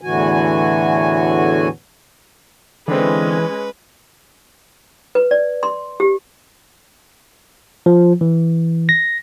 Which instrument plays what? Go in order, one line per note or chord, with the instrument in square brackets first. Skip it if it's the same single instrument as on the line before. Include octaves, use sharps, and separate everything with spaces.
[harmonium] E2 A2 D3 E3 F#4 G#5
[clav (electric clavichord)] D3 C4 [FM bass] E3 [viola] G#3 C#4 [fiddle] B4
[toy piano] B4
D5
C6
G4
[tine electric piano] F3
E3
A#6